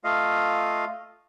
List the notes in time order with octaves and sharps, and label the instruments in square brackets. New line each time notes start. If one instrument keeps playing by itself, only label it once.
[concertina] A3 F4 D#5 F5